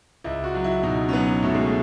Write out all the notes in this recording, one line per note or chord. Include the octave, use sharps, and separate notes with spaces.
C#2 E4
F#4
F#3
E4
B2 D#4
C#4
F#3 B3
B2 A3
G#3
A3